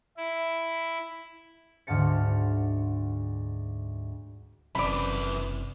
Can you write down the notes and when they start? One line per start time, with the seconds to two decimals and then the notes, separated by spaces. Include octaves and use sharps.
0.17 E4
1.87 D2 G#2 F5 A5 C#7
4.75 F#1 F#2 C3 E3 D5 B5